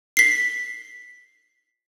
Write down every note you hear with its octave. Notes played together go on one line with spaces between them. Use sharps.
B6 C7